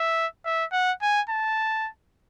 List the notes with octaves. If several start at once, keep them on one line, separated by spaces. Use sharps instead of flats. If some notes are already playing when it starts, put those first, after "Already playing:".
Already playing: E5
E5
F#5
G#5
A5